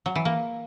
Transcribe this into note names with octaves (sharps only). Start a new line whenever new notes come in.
F#3
E3
A#3